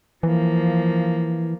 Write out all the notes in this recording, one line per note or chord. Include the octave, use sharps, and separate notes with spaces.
E3 F3 A#3